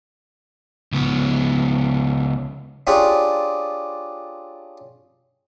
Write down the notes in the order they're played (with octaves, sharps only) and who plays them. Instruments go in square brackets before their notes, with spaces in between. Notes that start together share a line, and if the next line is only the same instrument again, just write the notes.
[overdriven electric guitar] C#2 B3
[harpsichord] C#4 D4 F4 G4 G#4